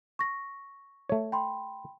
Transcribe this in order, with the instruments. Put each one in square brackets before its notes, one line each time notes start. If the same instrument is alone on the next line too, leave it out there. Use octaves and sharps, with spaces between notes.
[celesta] C#6 A#6
[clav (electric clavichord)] A3 C#5
[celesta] G5 B5 C6